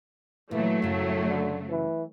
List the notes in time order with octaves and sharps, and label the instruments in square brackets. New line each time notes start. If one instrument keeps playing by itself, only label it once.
[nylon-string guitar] A#2 [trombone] E3 [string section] F#3 A3
[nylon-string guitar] F#2 C#3 [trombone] A2
[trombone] D3
E3